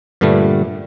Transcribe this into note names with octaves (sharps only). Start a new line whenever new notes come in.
G2 A#2 D3 G3 A3